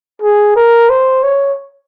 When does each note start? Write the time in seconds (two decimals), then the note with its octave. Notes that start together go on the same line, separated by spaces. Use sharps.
0.22 G#4
0.56 A#4
0.90 C5
1.24 C#5